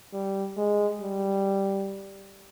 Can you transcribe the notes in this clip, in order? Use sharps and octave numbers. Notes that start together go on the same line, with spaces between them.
G3
G#3
G3